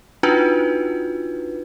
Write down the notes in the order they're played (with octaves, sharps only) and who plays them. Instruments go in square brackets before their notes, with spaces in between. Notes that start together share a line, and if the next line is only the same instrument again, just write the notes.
[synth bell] D4 D#4 F4 F#4 B4